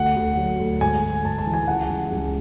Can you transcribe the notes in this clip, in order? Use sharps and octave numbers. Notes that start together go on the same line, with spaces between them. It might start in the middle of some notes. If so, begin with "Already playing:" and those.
Already playing: D2 F#5
D2
F#3
D2
G#2 G#5
G#2
G#2 A5
A5
E3
G#5
C#2 F#5
C#2
C#2